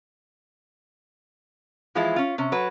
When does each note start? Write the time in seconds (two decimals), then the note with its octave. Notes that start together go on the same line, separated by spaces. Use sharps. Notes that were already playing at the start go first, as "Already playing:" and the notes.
1.95 E3 F3 G#3 E4 F4
2.16 C#4 F4
2.38 C3 C#4
2.52 F#3 B4